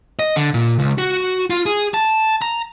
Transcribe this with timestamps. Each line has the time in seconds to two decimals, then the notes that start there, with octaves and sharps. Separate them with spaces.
0.19 D#5
0.36 D3
0.54 A#2
0.79 C#2
0.98 F#4
1.50 F4
1.66 G#4
1.94 A5
2.42 A#5